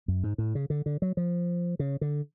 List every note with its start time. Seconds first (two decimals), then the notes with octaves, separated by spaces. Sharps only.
0.08 F#2
0.23 G#2
0.38 A2
0.55 C#3
0.70 D3
0.86 D3
1.02 F#3
1.17 F3
1.79 C#3
2.01 D3